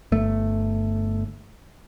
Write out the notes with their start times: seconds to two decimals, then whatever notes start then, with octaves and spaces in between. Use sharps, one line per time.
0.12 G1 A3